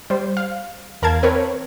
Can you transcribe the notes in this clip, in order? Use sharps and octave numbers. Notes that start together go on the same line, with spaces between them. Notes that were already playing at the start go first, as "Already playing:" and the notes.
G3 C5
F5
E2 A#4 F5 A5 G#6
C4 A#4 B4 C#5